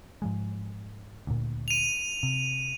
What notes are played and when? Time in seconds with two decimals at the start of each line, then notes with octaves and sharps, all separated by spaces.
0.22 G#2 F3 G#3
1.27 D2 A#2
1.68 D#7 F7
2.23 C3